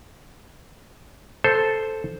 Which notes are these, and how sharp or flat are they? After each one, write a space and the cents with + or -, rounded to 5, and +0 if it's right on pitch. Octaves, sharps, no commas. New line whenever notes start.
A4 +0 C5 +0